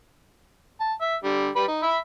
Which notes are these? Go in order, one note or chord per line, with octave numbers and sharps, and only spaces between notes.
A5
E5
D3 G3
G3 B4 B5
D#4
E5 B5